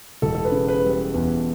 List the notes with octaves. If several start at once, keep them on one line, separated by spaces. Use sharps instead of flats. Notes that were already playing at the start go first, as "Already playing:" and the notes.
E1 A4
A4
B4
C#3
B4
G3
B4
E2